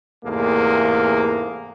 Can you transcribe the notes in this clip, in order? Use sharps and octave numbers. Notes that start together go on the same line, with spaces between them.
E2 G#2 C3 A3 A#3